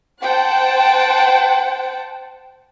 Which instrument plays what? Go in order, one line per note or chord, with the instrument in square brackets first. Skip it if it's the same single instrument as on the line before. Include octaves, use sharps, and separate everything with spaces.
[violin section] C5 F#5 G5 A5